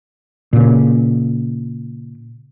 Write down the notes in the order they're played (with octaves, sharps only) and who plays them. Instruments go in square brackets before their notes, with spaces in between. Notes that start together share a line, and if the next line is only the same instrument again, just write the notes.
[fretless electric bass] A#2 C#3